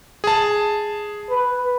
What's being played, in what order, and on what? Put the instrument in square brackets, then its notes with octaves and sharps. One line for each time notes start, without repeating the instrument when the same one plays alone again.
[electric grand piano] G#4 A5
[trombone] B4